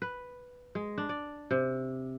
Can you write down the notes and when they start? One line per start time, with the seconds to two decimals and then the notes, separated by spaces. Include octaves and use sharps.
0.02 B4
0.75 G#3
0.98 D4
1.09 D5
1.51 C3